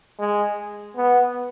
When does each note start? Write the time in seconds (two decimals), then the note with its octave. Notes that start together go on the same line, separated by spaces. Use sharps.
0.19 G#3
0.96 B3